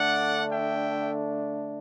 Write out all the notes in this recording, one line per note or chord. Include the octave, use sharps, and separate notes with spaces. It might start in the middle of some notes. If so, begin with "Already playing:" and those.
Already playing: D3 A3 D4 D5 F#5
E5 G5